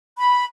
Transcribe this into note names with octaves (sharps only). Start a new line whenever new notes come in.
B5